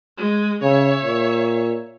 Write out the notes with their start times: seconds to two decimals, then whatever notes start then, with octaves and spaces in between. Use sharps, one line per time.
0.17 G#3
0.63 C#3 C#5 E5
1.04 A#2